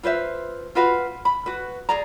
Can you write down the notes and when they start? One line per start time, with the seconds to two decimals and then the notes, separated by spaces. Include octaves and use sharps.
0.03 F4 B4 C5 E5
0.75 F4 F#4 B4 F5
1.25 B5
1.46 F#4 B4
1.89 G#4 D5 A#5